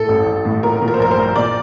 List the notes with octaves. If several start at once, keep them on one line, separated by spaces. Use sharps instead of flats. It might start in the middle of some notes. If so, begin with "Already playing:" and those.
Already playing: A2 A4
A1
A1
A2
A#2 A#4
A#2
A#4
C5
A#1 A#4
C5
A#1
A#2 D5